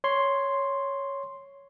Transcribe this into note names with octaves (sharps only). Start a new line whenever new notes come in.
C#5 C6